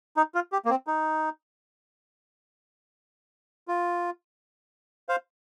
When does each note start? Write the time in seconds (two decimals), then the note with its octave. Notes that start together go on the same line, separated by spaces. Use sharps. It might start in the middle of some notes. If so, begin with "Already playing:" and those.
0.17 D#4
0.35 F4
0.52 G4
0.65 A#3
0.70 C4
0.87 D#4
3.68 F4
5.09 C5 F5